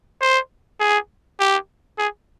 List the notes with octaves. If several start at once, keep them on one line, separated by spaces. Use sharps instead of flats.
C5
G#4
G4
G#4